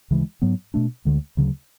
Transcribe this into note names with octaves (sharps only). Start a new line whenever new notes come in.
D2 C#3 E3 G#3
G#2 F#3 B3
B2 A3 D4
D2 D3 G#3
D2 C#3 F#3